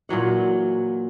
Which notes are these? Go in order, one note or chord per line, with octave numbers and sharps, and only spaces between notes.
A#2 E3 F#3 F#5